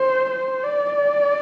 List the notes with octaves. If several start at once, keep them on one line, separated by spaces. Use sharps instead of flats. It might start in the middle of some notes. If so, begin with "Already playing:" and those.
Already playing: C5
C5
D5
D5